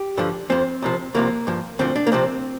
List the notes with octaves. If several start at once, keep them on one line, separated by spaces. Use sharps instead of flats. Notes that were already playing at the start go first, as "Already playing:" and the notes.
Already playing: G4
G2 D3 F3
F2 F3 C4
C2 C3 F3
C2 C3 F3 A#3
G2 F3
D2 D3 F3 C4
D4
A#3
C2 C3 F3 C4